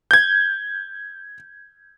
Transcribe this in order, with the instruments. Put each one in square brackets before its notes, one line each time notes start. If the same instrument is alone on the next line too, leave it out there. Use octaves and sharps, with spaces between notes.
[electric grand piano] G6 G#6